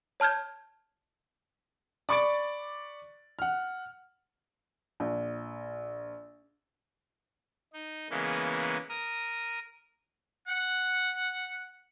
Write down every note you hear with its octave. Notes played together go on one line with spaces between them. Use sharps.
C#5 A5 F6 G6 G#6
D5 B5 C#6 D6 A6 D7
F#5 F6
A#1
D#4
C#3 E3 G#3 A#3 B3
A#4 D#6
F#5